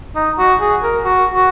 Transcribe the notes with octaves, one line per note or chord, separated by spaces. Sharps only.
D#4
F#4
G#4
A#4
F#4
F#4